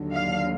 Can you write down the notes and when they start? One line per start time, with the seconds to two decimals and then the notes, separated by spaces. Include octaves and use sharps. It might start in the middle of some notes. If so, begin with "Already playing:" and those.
Already playing: D#2 D3 F#3
0.13 F5